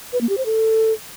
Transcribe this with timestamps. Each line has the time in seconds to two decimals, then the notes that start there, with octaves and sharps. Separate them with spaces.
0.13 B4
0.21 A#3
0.29 G4
0.37 C5
0.46 A4